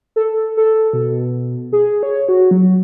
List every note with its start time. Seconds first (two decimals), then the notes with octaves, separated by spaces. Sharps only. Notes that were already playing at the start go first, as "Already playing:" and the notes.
0.16 A4
0.57 A4
0.93 B2
1.73 G#4
2.03 C#5
2.29 F#4
2.51 F#3